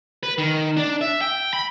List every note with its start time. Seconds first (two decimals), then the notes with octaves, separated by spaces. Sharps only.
0.23 B4
0.38 D#3
0.77 D4
1.01 E5
1.21 G5
1.53 B5